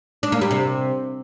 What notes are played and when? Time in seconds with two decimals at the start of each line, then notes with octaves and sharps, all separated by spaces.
0.23 D4
0.32 A#3
0.41 G3
0.51 C3